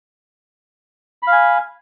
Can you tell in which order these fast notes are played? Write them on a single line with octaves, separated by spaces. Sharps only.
B5 F5 G#5